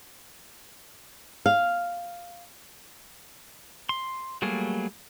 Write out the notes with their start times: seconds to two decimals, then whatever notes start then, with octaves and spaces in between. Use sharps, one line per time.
1.46 F5
3.89 C6
4.42 F#3 G3 A3 A#3 G#4